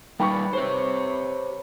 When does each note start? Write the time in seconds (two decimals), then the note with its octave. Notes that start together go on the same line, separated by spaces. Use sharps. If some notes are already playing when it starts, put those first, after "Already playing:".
0.20 G3 D#4 F4 B4 G5 B5 C#6
0.53 G4 C5 C#5